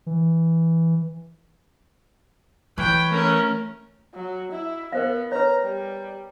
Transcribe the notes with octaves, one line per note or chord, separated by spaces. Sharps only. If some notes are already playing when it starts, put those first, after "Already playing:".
E3
E3 B4 C#5 G5
A3 C#4 A#4
F#3
E4
B3 A#4 C5 F5
B4 C#5 A#5
G3